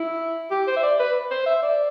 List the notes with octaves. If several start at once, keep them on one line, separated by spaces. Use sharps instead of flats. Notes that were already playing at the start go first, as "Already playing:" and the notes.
Already playing: E4
G4
C5
E5
D5
B4
C5
E5
D5